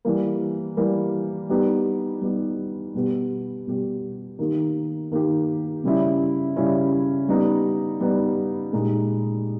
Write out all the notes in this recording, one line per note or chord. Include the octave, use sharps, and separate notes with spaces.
E3 G3 A#3
E3 G3 A#3
G3 B3 D#4 G4
G3 B3 D#4 G4
B2 G3 B3 G4
B2 G3 B3 G4
D#3 A#3 D#4 G4
D#3 A#3 D#4 G4
C#3 G3 C#4 E4
C#3 G3 C#4 E4
G3 B3 D#4
G3 B3 D#4
A#2 G#3 D#4 G4